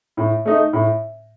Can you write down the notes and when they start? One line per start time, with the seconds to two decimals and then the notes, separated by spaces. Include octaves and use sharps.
0.17 A2
0.45 A3 D#4
0.73 A2